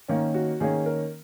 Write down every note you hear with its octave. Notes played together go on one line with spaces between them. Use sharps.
D#3 A#3 C#4
F#4
D#3 A#3 C#4 G#4
A#4